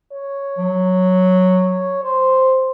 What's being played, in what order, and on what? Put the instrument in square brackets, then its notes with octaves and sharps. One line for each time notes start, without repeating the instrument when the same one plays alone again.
[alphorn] C#5
[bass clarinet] F#3
[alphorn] C5